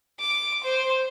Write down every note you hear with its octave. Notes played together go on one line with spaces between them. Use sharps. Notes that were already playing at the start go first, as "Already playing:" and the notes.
D6
C5